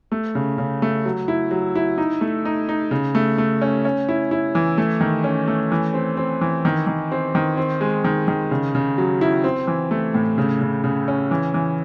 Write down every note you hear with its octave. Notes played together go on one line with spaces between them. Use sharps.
A3
C#3
C#3
A3
F#3
E4
F#3
E4
D#4
A3
D#4
D#4
C#3
A3
A3
C#4
C#4
E4
E4
E3
A3
D#3
C#4
A3
E3
C4
C4
E3
D#3
D#3
C4
D#3
C4
G#3
D#3
D#3
C#3
C#3
F#3
E4
C4
E3
A3
A2
C#3
C#3
C#3
C#4
E3
E3